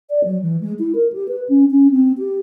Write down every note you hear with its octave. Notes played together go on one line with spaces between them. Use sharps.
D5
F#3
E3
G#3
E4
A#4
G4
B4
C#4
C#4
C4
G4